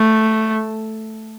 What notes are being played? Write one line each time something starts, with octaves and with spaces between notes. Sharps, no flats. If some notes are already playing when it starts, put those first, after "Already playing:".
Already playing: A3